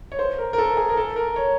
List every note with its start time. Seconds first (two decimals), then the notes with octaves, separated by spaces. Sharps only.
0.12 C#5
0.19 C5
0.38 A#4
0.53 A#4
0.58 A4
0.77 G#4
0.89 A#4
0.97 A4
1.16 A#4
1.36 C#5